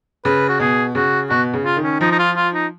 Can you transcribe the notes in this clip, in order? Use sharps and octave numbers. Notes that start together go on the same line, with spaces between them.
C#3 B4
F#4
B2 G#4
C#3 F#4
B2 F#4
C#3
F4
D#3
C#4
F3 D#4
D#4
F4
F4
D#4